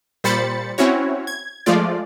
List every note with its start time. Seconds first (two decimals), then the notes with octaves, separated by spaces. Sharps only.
0.24 A#2 G3 C5 B5 A6 C#7
0.78 C4 C#4 E4 F#4 C#5
1.27 G#6
1.66 F3 G#3 A3 F4 D5